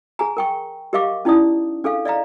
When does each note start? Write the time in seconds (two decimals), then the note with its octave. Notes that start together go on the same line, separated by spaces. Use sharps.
0.19 G#4 G#5 A#5
0.37 A#4 G5 C#6
0.93 G4 A#4 D#5 F5 C#6 D6
1.25 C#4 D#4 E4 D5 D#6
1.84 D4 G#4 A4 F5
2.05 D5 D#5 F5 A#5